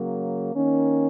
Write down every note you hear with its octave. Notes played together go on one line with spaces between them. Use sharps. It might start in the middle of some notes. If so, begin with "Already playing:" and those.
Already playing: C#3 F#3 A#3
D#3 A#3 C#4